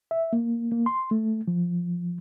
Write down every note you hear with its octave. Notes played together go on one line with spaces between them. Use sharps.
E5
A#3
A#3
C6
A3
F3